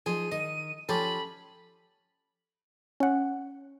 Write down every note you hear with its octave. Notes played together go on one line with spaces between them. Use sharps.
F3 D#4 G#4 D#7
D#3 D#5
F3 C#4 G4 A4 B5
C#4 F#5